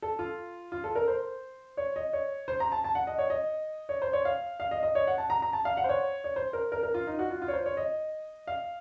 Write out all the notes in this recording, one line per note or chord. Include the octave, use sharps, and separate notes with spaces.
A4
F4
F4
A4
A#4
C5
C#5
D#5
C#5
C5
A#5
A5
A5
F#5
D#5
C#5
D#5
C#5
C5
C#5
F5
F5
D#5
D#5
C#5
F#5
A5
A#5
A#5
A5
F5
F#5
C5
C#5
C#5
C5
A#4
A#4
A#4
F4
D#4
F#4
F4
F4
C#5
C5
C#5
D#5
F5